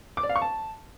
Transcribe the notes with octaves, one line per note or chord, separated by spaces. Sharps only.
D6
D5
F5
C#6
A5